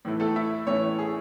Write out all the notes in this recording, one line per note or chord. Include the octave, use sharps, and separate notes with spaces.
A2 E3 A3 E4
A3 A4
E4 E5
A2 E3 A3 C#4 E4 C#5
G#4